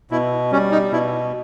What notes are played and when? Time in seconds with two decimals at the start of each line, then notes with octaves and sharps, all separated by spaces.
0.11 B2 E4
0.52 G3 C#4
0.72 D#4
0.92 B2 E4